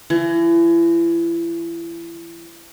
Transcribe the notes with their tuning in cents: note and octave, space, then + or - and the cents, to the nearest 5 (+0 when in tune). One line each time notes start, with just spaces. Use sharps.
E3 +35